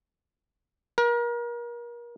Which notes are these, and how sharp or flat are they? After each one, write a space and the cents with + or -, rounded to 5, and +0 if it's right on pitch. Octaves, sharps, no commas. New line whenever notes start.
A#4 +35